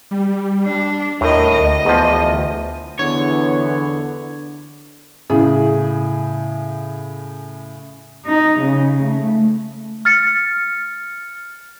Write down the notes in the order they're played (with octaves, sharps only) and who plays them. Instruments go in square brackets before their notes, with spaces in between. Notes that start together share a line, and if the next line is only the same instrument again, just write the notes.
[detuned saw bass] G3
[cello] D4
[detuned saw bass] D#2 [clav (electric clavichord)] A2 [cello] A#4 D#5
[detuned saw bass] D2 [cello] D#5
[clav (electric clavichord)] E2 F3
[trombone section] E2 B3 [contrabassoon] D3 [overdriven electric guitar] C#5
[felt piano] A2 C#3 G#4
[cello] D#4
C#3
A3
[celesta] F6 A6 C#7